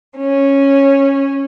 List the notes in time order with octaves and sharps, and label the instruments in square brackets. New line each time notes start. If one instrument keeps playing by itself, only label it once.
[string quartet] C#4